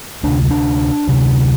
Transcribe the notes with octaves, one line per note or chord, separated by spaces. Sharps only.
D2 C3 D4
D4
D2 C3